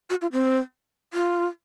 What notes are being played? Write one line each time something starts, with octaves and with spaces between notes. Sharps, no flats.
F#4
F4
C4
F4